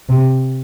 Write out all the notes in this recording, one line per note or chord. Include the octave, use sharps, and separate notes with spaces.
C3